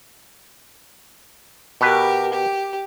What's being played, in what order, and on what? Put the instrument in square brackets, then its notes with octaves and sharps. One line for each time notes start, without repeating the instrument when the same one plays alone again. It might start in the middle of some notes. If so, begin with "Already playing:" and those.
[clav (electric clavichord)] B2 B4 [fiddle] G4 A#4
[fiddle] G4